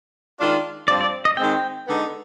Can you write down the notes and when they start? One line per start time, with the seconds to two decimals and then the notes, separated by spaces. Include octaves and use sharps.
0.39 D#3 G#3 D4 F4
0.88 G2 F3 C4 D5
1.01 D5
1.25 D#5
1.37 D#3 G#3 C4 G5
1.86 D3 G#3 B3 D#4